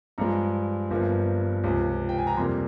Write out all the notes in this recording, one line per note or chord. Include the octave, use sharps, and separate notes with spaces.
G2 F3 G#3 A#5
G1 G2 F3 A#3
C#2 C3 F3
G5
G#5
A#5
F2 C3 G3 A#3 C6